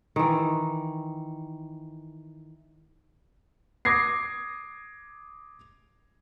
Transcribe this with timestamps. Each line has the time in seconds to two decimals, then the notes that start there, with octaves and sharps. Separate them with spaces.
0.16 D#3 E3
3.85 D6 D#6 G#6 A#6 C7